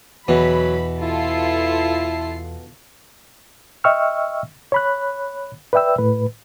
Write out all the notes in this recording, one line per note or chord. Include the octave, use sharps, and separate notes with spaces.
E2 B2 E3 F#3 B5
E4 F4 A4 C7
D#5 E5 G5 C#6 E6 F6
C#5 B5 F#6
B4 D5 E5 G5 E6
A2 B4